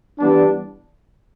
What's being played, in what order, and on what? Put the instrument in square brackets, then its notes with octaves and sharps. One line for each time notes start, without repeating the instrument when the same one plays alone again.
[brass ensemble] E3 G3 B3 D4